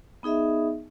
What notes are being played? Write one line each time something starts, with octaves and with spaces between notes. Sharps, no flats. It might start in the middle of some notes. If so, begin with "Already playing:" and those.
B3 D#4 G#4 D#5 E5